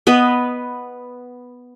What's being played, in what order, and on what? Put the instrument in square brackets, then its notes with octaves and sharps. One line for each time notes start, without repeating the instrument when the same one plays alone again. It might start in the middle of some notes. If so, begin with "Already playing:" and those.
[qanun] B3 B4 D#5